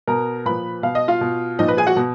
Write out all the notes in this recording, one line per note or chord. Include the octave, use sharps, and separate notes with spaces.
B2 A#4 A#5
A#2 F3 B4 B5
B2 F5
D#5
F4 F5
B2
A#2 F3 D#4 D#5
B4
G#4 G#5
F#4 F#5
B2